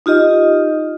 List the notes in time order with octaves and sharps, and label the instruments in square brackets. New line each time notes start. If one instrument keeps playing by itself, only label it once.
[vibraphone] D#4 F4 G4 D#5